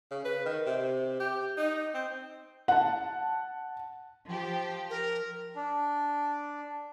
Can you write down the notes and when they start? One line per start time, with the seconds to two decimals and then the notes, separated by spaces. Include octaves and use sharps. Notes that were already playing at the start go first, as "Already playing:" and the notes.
0.11 C#3
0.25 B4
0.46 D#3
0.67 C3
1.20 G4
1.57 D#4
1.94 C4
2.68 F#5 A5
4.28 F3 G4
4.90 A#4
5.56 D4